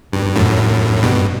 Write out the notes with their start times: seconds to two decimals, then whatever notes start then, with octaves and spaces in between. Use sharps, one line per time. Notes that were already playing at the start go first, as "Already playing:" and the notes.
0.13 G2
0.36 F#2 A2
1.02 G2 B2